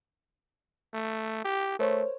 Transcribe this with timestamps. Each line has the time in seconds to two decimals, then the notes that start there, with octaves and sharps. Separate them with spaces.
0.94 A3
1.45 G4
1.79 A3 A#4 C5 C#5